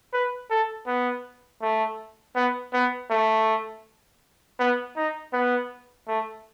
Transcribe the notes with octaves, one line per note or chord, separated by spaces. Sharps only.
B4
A4
B3
A3
B3
B3
A3
B3
D#4
B3
A3